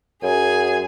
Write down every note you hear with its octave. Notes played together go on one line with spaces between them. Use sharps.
F#2 G#4 G#5